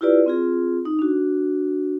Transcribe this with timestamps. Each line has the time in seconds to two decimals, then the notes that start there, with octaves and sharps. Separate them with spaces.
0.01 E4 F4 G4 B4 D5
0.26 C4 F4 G#4
0.85 D#4
0.99 D4 F#4